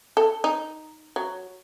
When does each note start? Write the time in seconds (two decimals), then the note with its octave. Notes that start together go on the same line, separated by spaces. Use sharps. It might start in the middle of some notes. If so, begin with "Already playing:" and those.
0.17 A4
0.44 D#4
1.16 F#3